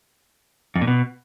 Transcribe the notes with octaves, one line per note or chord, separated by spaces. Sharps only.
F2
A#2
B2